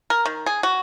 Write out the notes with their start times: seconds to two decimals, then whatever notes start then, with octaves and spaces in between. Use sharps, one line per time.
0.10 A#4
0.25 D#3
0.46 G#4
0.63 F#4